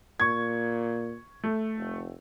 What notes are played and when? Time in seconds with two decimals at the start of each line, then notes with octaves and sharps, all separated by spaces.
0.20 A#2 C#6 G#6
1.44 A3
1.77 F1